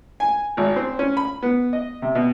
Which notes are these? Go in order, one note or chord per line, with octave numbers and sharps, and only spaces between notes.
G#5
G#1
C4
C#4
B5
B3
D#5
C3
B2